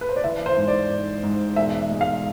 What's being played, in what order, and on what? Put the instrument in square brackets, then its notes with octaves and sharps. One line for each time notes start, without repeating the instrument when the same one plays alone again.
[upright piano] B4
C5
D5
E3 E5
C5
G#2
D5
G#2
G#2
E1 E5
G#3
F5